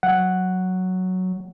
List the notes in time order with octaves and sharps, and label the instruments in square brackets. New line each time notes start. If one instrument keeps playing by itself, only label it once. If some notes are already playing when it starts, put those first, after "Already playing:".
[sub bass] F#3 [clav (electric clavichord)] F#5